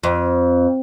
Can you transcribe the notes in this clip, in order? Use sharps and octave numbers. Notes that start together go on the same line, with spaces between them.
F2